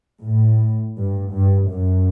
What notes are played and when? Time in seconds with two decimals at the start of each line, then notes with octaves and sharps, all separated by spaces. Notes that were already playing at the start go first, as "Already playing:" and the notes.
0.23 A2
0.97 G2
1.33 G2
1.71 F#2